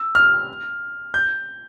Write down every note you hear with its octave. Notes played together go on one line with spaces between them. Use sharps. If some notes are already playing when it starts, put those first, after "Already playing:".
Already playing: E6
F6
G6